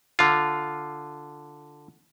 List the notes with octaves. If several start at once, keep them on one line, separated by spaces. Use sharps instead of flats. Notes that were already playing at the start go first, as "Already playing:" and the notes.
D3 F4